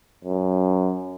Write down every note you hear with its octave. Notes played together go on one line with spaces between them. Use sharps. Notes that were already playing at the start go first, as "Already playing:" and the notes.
F#2